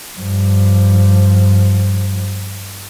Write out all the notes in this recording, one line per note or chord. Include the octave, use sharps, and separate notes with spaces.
G2 F3